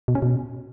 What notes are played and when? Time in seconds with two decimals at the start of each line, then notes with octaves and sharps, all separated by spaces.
0.08 B2
0.15 C#4
0.22 B2